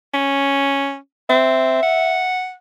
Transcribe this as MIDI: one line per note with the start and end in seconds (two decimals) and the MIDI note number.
0.14 0.96 61
1.29 1.79 60
1.29 2.27 76
1.83 2.53 78